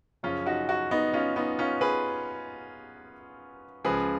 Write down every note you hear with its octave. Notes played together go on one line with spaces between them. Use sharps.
F#2 C#3 F3 C#4 F4
D#4 F#4
D#4 F#4
B3 D#4
C#4 F4
B3 D#4
C#4 F4
G#4 B4
C#2 C#3 F3 G#4 B4